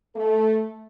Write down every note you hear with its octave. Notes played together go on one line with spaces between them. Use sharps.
A3 A4